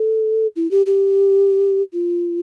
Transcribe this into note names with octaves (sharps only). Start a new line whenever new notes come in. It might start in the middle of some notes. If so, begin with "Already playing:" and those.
Already playing: A4
E4
G4
G4
F4